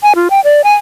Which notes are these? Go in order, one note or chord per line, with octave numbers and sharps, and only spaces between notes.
G#5
F4
G5
D5
G#5